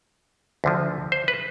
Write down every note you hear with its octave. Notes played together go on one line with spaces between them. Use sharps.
D2 D3 F3
C5
B4